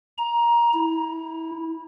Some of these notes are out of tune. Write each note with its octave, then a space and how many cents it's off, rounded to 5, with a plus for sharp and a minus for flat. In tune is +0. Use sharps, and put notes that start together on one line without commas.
A#5 +15
E4 -25